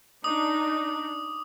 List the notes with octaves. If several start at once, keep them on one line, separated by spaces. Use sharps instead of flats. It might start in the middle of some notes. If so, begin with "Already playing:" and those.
D4 D#4 D6 D#6